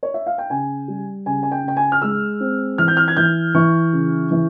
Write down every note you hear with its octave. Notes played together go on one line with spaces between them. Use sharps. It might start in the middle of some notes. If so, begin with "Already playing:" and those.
C#5
E5
F5
G5
C#3 G#5
G3
C#3 G#5
G#5
G5
C#3 G5
G#5
F6
G#3 E6
C4
E3 F6
G6
F6
G#6
E3 G6
E3 C#6
C#3
E3